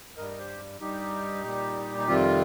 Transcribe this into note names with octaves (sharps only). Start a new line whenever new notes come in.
G2 G3 A#4 D#5
D#5
G4 C5
G2 G3 D#4 G4
A#2 G3
D#4
F2 C3 D#3 G3 C4 F4